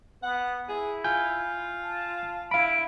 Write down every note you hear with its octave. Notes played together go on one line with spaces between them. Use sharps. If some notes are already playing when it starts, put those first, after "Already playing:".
B3 F#5
E4 G#4
F4 G#5 G6
A5
E4 F5 B5 D7